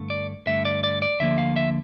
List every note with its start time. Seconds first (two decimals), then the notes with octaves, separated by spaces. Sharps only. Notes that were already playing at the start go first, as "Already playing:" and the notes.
Already playing: G2 D3 A3
0.10 D5
0.46 G2 D3 A3 E5
0.65 D5
0.84 D5
1.02 D5
1.20 D2 D3 F3 A#3 E5
1.38 F5
1.56 E5